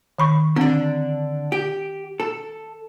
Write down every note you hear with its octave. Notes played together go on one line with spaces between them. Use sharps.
D#3 B5 C#6
D3 C4 D4
G4
A4